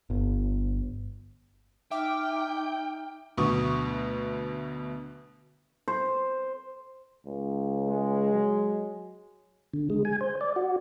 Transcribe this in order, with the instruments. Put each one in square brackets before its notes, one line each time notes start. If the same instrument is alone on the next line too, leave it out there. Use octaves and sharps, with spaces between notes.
[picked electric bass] G1
[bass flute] D#4 [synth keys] E5 D6 F6 [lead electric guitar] G5
[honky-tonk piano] D2 B2 F#3 C#6 D#6
[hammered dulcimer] C5
[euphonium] C#2
[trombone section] G#3
[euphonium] F#3
[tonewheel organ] D3
G#3
G#5
C5
D5
F#4